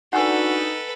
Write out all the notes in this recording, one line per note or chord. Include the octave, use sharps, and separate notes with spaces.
D4 D#4 F#4 A4 B4 F#5 G#5 E6